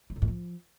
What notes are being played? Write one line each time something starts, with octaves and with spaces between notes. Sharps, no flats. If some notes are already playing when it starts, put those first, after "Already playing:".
F#3
A2
G2
F3